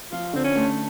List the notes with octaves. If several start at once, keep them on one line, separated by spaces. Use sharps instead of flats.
F3 F4
D3 C4
C#4
A3